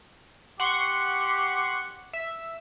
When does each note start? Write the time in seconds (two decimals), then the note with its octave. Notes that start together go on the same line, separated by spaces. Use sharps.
0.60 G4 F#5 C6 C#6
2.13 E5